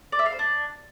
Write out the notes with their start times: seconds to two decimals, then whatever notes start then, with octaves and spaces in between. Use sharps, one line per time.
0.12 D5
0.19 E5
0.26 F5
0.32 C5
0.39 D4